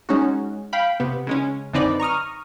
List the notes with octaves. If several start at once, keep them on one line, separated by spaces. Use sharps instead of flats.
G#3 C#4 D#4 F#4
F5 G5 B5
C3 B3
C#3 G#3 C#4
F#2 D3 C4 D#4 B4 D5
A#5 C#6 D#6 F6